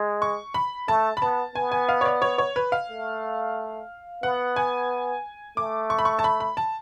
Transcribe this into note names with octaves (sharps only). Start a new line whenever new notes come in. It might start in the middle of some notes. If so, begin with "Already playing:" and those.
Already playing: G#3
C#6
B5
A3 A5
B5
B3 A5
B3 G#5
G#5
F5
C#5
D5
C#5
C#5
B4
F5
A3
B3 F#5
G#5
A3 D6
C#6
B5
C#6
A5
B5
B5
A5